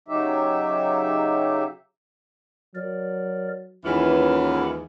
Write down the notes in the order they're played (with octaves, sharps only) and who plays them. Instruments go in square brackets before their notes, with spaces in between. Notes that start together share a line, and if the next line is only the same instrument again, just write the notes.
[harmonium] C#3 F#3 D#4 G4 E5
[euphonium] F#3 [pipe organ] A#4 D5
[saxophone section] D#2 G#2 E3 [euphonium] C#4 [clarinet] F4 [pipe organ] A#4 F#5 B5